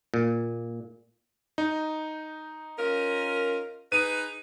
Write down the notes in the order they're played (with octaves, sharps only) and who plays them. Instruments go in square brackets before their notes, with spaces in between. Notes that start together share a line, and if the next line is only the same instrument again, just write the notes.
[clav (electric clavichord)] A#2
[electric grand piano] D#4
[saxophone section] C#4 F4 A#4
[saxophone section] D#4 G#4 B4 [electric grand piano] D#7